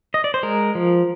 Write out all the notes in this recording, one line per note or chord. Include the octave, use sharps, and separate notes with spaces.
D#5
D5
C5
G#3 A#4
F3